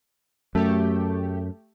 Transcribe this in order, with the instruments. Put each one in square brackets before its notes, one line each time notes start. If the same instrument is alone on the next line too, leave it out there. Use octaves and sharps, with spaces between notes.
[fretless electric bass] F#2 [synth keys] A3 G4